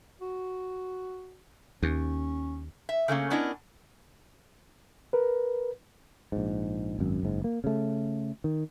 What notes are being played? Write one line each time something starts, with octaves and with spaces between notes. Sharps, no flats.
F#4
D#2 C#4
E5
C#3 A3 A#3 C#4
B3 C#4 D4 E4 A#4 D#5
A#4 B4
A#1 G#2
G#1 F#2
F#1 G#2
A#3
C#3 A3
D#3